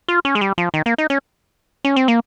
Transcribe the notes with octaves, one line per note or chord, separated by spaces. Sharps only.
F4
C#4
G#3
G3
F3
D#3
A#3
D#4
C#4
C#4
C4
A#3